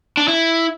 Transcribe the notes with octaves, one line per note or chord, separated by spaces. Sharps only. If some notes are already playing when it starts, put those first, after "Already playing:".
D4
E4